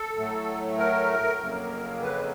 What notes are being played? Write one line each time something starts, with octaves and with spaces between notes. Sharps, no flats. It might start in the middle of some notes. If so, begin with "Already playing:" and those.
Already playing: A4
A2 F#3 A3
A#4
F2 C#3 F#3 A#3
B4